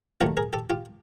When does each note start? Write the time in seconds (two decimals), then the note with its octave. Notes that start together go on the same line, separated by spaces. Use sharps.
0.21 D#2 D#3 F#3 A3 F4 G4
0.37 G#4 A#4
0.53 G4 A4
0.70 F4 G4